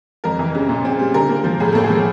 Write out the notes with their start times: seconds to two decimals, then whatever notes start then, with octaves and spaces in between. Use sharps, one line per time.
0.24 F2 A#4
0.39 E3
0.55 C#3
0.69 A#2
0.85 C4
0.99 G3
1.14 D3 A#4
1.29 A#3
1.44 F3
1.60 A2 G#4
1.72 A#3 A4
1.84 G#4
1.90 F3